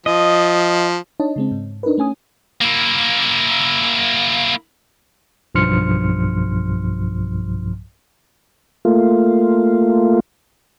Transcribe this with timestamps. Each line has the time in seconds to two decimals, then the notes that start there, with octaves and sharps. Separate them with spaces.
0.06 F3 D#5
1.20 D4 D#4 C#5 D#5 A5
1.36 C#3 G#3 C4
1.51 G#2
1.83 D4 D#4 A#4 B4
1.98 A3 C#4 G#5 D#6
2.61 A#3 E4
5.55 B1 G2 F3 C6 F6 C#7
8.85 A3 A#3 F4